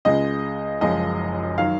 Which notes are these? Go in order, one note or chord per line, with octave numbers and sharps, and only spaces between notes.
C#2 C#3 G#3 D#5
F#1 F#2 F3 G#3 D#5
D#3 F#3 F5